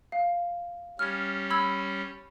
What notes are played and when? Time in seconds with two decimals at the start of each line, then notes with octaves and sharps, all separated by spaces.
0.12 F5
0.99 G3 C#4 F6 G#6
1.50 B5 E6 G#6